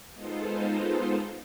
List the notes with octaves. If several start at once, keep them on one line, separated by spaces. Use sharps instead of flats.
G#3 B3 D#4 F4 A4 C5